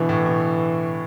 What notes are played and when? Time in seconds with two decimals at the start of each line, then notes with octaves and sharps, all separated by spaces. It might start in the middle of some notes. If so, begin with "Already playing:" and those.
Already playing: B2 D3 E3
0.09 A2
0.26 B2